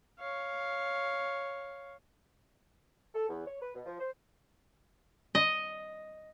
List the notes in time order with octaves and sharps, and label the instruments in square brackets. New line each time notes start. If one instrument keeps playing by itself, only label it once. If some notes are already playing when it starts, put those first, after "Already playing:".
[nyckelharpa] C#5 F5
[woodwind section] A4
E2
C#5
B4
B2
F3
C5
[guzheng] D#5